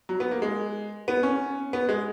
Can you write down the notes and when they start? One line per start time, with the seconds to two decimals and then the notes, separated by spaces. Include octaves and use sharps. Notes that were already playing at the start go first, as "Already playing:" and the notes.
0.09 F#3
0.20 B3
0.31 A#3
0.42 G#3
1.08 B3
1.23 C#4
1.73 B3
1.89 G#3